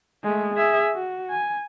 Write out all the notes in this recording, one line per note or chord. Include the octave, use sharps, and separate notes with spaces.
G#3 A3
G#4 E5
F#4
G#5